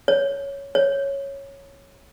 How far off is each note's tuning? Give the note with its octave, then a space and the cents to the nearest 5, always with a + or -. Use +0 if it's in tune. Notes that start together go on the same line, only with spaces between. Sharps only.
C#5 +5
C#5 -5